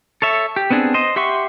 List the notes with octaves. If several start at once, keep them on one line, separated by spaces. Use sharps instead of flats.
A4 C#5 E5
G4
B3 C4 D4 G#4
C5 D#5
G4 E5 F#5 C6 C#6